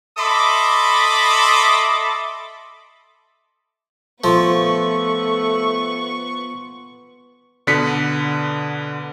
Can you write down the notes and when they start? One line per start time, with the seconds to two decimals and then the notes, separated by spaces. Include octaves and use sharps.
0.19 A4 D#5 E5 B5 C6 D6
4.24 F3 A3 B3 C#6
7.67 B2 D3 B3 B4 B6 C#7